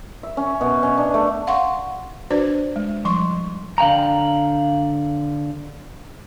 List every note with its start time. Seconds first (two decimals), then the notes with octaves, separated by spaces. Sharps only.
0.23 E5
0.37 C#4
0.61 B2
0.83 C#4
0.98 D4
1.14 A3
1.47 F5 F#5 C6 C#6
2.31 D4 F#4 B4 C5 D5
2.76 G#3
3.05 F3 G3 C6 C#6
3.78 D3 F5 G5 A#5